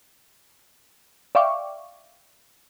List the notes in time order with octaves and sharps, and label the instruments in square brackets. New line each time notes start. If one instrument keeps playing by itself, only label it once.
[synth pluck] D5 E5 F5 G5 C#6 D6